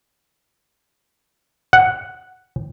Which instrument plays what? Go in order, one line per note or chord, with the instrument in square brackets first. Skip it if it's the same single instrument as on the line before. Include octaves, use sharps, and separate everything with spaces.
[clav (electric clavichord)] F#5